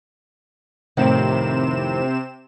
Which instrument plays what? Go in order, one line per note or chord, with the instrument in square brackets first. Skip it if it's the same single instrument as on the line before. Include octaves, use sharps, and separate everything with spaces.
[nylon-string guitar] F2 A2 D#3 [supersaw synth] C3 C4 E7